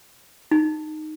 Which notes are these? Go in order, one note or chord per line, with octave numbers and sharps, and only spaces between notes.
D#4